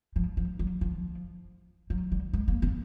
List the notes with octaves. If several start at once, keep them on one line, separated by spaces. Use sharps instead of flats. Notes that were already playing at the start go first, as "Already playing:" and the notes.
F3
F3
F#3
F3
F#3
G3
G#3
A#3
B3